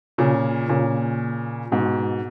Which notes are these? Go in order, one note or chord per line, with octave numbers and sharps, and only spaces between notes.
A#2 C#3
A#2 C#3
G#2 B2